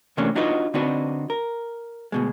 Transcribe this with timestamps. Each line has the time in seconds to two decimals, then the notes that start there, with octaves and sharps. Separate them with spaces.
0.17 C3 E3 A3 A#3 C#4 D4
0.35 D4 D#4 F4 F#4 B4 D#5
0.74 D3 C4 D4 D#4 F#4 B4
1.30 A#4
2.12 D2 B2 G#3